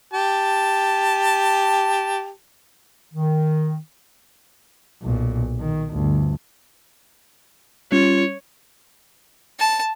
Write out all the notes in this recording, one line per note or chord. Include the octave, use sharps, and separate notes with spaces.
G4 A5
D#3
B1 A#2
D#3
G1 D2
G3 C#4 F4 C#5
A5